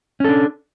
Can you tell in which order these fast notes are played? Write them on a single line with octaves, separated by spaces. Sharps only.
C#4 A4 D4